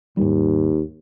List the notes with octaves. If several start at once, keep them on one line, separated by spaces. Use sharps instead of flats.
D#2 G#2 G3